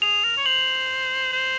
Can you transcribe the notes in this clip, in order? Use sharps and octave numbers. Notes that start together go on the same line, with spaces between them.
G#4 F7
A#4
C#5
C5 F#7
C5